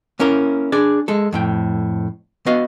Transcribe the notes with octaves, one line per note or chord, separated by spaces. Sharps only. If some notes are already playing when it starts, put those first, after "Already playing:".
A#3 C#4 E4 A#4
D4 G#4 D5
G#3 A4
F2 A2 G5
B3 F#4 D#5 F5